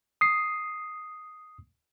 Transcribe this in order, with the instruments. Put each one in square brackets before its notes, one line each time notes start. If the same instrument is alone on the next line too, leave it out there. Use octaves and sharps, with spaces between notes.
[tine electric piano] D#6 C7